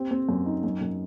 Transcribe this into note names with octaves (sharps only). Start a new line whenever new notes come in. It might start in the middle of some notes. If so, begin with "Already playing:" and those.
Already playing: C4 G4
C4
F#2
D#4
F#2
F#2